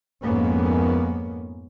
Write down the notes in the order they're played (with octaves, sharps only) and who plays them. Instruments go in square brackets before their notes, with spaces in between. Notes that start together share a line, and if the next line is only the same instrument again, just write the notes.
[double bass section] F2 G#2 A#3 B3 C#4